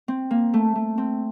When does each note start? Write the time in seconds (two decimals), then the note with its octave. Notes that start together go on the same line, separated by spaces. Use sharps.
0.08 C4
0.31 A#3
0.54 A3
0.75 A3
0.98 C4